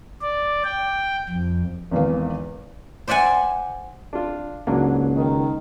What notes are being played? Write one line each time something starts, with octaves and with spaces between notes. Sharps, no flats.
D5
G5
F2
G#1 E2 D#3 F5
C5 D5 E5 F#5 G#5
D4 F4
C#2 G#2 F#3 A#3 D4
D#3